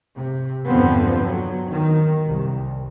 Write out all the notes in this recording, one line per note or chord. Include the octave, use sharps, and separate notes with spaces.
C3
E2 G2 D3 F3 B3 C4
F#3
D#3
C2